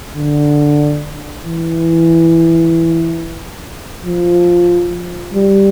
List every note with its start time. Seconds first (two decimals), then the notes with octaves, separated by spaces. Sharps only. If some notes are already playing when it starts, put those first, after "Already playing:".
0.16 D3
1.46 E3
4.05 F3
5.34 G3